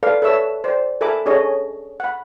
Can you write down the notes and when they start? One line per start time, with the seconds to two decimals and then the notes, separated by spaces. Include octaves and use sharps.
0.03 A4 B4 D5 F5
0.22 A4 B4 C#5 E5 E6
0.64 C5 D5
1.01 A4 A#4 E5 G#5 B5 D6
1.26 C#4 D4 G#4 A4 C#5 D#5
2.00 F#5 B5